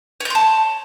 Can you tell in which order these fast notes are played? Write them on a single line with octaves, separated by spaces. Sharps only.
C#5 G6 C6 A5